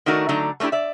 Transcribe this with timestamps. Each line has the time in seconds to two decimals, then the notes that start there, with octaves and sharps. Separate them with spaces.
0.06 D#3 A3 D4 D#4 F#4 A#4
0.29 D3 F#3 A3 D#4 D5 A#5
0.60 A3 A#3 D4 E4 G4
0.72 D5 E5